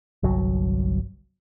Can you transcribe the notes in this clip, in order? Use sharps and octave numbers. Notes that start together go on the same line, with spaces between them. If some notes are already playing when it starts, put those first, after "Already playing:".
G1 C2 F#3